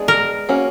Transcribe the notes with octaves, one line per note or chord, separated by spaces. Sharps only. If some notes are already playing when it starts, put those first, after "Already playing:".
Already playing: G#3 B3 D4 G#4
A#4
A#3 C#4 F#4